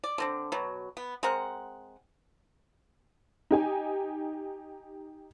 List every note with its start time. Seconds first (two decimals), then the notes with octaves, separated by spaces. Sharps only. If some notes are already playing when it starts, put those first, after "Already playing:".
0.04 D5
0.18 D3 C4 D4
0.52 B2 F#3
0.97 B3
1.23 G#3 C4 A#4 F#5
3.51 D#4 G4 G#5